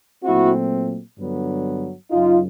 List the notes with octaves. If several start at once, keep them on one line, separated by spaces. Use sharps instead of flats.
A#2 F#3 A3 C4 E4 F#4
G2 D3 F#3 B3
F#2 C#3 F#3 D#4 F4